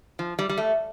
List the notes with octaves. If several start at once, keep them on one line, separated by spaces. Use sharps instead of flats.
F3
G3
G3
A3